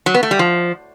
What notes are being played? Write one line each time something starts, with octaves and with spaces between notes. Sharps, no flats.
F#3
B3
A3
G3
F3